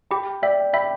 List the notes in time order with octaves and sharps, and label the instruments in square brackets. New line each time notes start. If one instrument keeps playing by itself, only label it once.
[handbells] G4 [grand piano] G5 B5
[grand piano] D5 G5 [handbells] E5
[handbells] E5 [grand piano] G5 B5